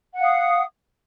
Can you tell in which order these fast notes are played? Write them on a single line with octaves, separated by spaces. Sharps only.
F#5 F5 D#6